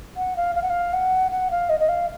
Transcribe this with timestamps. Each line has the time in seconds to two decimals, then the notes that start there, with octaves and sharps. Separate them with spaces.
0.17 F#5
0.36 F5
0.55 F5
0.62 F#5
0.70 F5
0.93 F#5
1.31 F#5
1.51 F5
1.69 D#5
1.80 D#5
1.88 F5